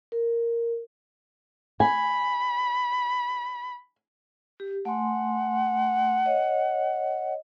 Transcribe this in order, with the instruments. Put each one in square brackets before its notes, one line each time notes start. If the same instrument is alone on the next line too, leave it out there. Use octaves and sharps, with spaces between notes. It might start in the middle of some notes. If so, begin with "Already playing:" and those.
[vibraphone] A#4
[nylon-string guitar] G#5 [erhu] B5
[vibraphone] G4
[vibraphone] A3 G#5 C6 [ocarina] F#5
[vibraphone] C#5 D#5